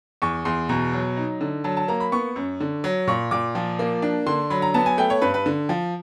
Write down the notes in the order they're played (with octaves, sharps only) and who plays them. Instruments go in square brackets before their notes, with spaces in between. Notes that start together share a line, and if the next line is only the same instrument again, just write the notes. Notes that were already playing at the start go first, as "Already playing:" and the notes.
[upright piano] E2 C#6
E2 C6
B2 A#5
F#3
D#4
D3
F#3 A5
A5
A#3 A#5
B5
B3 C#6
F#2
D3
F#3
A#2 C#6
A#2 D6
F3
A#3
D4
D3 C6
F#3 B5
A#5
B3 A5
G#5
A3 G5
C#5
G2 B4
B4
D3
F3